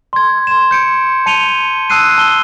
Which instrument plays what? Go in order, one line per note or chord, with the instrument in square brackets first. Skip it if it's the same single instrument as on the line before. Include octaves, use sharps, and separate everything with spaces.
[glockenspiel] C6 G#6
C6 E7
G6 C#7 D7
A5 C#7 D#7 F7 G7
A5 D#6 E6 F#6 C7 D#7
A5 G7